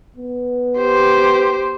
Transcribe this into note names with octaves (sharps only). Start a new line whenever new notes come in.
B3
G4 C5